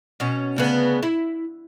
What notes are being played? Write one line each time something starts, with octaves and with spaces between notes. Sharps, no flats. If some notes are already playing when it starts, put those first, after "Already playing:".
B2 C#4
D2 C#3 B3
E4